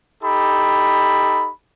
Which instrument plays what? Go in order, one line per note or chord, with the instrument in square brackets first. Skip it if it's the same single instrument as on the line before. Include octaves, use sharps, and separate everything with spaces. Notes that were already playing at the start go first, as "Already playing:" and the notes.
[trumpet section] D#4 G4 A4 B5